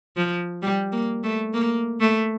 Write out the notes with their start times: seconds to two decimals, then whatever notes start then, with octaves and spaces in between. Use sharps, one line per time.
0.17 F3
0.62 G3
0.92 A#3
1.24 A3
1.54 A#3
2.00 A3